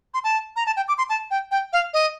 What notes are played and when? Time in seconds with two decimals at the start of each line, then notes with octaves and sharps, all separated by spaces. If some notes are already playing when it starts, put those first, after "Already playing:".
0.14 C6
0.24 A5
0.56 A#5
0.66 A5
0.77 G5
0.88 D6
0.98 C6
1.10 A5
1.31 G5
1.51 G5
1.73 F5
1.94 D#5